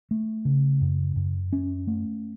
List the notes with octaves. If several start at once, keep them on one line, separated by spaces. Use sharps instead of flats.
A3
C#3
F#2
F#2
C#4
A3